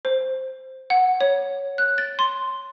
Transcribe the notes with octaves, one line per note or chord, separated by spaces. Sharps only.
C5
F#5
C#5
F#6
A6
C6